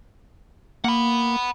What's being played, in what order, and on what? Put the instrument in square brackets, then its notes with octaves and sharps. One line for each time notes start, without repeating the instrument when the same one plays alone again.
[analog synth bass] A#3 [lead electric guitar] F#5 B5